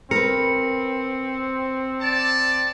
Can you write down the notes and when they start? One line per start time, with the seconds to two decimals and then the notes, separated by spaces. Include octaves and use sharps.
0.11 C4 A#4 B4 C#7
2.01 D5 A5